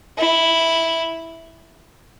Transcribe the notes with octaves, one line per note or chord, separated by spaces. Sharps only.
E4